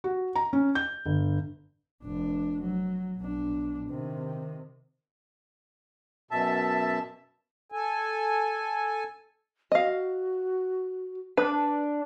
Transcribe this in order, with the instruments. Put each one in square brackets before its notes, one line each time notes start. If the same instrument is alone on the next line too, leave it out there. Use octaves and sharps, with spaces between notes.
[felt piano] F#4
A#5
C#4
G6
G1
[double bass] F1 D4
F#3
B1 D4
C3 D#3
[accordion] F#2 B2 E5 A5
[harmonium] A4 G#5
[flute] F#4 [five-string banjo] D#5 F5
[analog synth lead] D4 [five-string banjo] B4